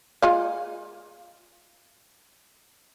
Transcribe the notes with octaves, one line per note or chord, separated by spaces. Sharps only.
G#3 F4 F5